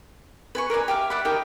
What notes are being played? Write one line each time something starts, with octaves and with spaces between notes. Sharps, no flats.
B4 G#5 C#6
A#4 B4 D5 G#5
G4 E5 F5
D5 E5 F#5 B5
D#4 G4 A#4 G5